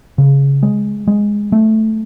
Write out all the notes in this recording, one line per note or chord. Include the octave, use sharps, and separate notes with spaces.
C#3
G#3
G#3
A3